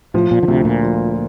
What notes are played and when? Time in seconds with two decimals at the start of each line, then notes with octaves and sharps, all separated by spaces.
0.14 A2 F3
0.31 A#2
0.43 D3
0.48 D2 C3
0.65 A#2
0.83 F3